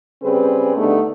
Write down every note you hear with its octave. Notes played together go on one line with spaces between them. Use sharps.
C#3 G3 C4 G#4 B4
D3 G3 A3 B3 D4 D#4